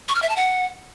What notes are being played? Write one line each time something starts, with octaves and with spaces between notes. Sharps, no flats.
C#6
F6
E5
A5
F#5